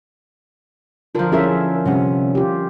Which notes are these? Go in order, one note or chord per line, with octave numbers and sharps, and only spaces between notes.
D3 F3 F4 A#4
C#4 E4 F4 G#4 A#4 E5
C3 G3 C#4 F#5
F4 G4